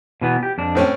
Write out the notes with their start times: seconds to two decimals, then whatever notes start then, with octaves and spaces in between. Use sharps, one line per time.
0.21 B2 E3 B3
0.43 G4
0.58 F2 D4
0.75 A2 C4 C#4